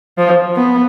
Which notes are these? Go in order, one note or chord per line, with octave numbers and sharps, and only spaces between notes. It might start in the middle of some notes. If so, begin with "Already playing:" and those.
F3
B3